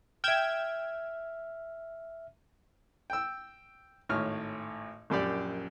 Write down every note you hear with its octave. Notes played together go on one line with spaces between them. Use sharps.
E5 G5 F6 G#6 E7
G5 E6
G#1 A2 C#5 F6
A#1 F#2 G4 D5